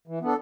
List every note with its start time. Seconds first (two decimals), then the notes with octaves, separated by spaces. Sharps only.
0.07 E3
0.21 B3 D4 A4